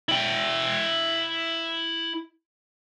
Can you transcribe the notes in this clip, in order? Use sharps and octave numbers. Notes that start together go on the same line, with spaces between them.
E4 G5